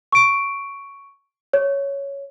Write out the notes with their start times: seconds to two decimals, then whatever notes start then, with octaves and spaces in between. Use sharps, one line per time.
0.12 C#6 D7
1.53 C#5